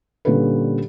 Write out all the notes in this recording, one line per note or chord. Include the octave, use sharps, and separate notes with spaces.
A#2 D3 G3 C#4 A4 B4